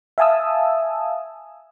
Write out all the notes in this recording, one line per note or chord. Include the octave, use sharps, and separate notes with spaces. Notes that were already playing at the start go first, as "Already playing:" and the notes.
E5 F5 G#5 A5 D#6 E6